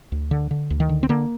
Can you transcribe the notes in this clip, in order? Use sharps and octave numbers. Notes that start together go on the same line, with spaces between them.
D2
D3
D3
D2
D#3
D3
C4
D3 A#3